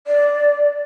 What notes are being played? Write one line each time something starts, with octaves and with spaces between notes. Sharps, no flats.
D5